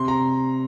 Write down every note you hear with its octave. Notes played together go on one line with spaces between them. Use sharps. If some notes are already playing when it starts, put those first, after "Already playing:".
Already playing: C3 C6
A#5